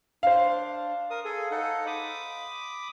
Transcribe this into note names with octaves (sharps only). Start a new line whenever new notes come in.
D4 C5 F5
A#4 D#6
G#4 A4 G#5
D#4 A4 F#5
B5 D6 D#6